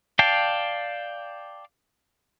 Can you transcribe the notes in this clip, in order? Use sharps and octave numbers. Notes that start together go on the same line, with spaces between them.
D5 F5 G5 A5